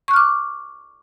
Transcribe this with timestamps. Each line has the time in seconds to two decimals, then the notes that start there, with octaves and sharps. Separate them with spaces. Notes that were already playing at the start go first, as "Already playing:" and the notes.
0.08 C#6
0.11 F#6
0.14 F6
0.16 D6